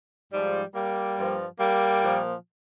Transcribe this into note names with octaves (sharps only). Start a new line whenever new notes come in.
G#2 F3 G3
G3 A#3
G2 F3
G3 A#3
A#2 F3